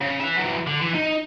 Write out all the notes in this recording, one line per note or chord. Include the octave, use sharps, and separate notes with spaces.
C#3
B4 E5
E3 F#3
D3
E3
D#4